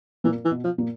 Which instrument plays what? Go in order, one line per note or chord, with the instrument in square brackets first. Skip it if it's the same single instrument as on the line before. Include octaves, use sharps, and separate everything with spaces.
[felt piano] A#2 A#3 [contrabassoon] E3
[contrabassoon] E3
[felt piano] B2 B3
[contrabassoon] F3
[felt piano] A#2 A#3